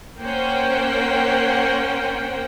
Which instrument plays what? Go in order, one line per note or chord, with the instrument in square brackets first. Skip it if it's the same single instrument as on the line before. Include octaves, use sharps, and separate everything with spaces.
[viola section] A#3 C#4 A#4 C5 F#5 G5